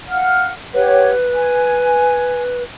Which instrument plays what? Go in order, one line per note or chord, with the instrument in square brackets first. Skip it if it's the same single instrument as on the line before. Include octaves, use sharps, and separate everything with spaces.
[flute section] F5 F#5 F6
[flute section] G4 C#5 F#5 [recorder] B4
[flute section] G#5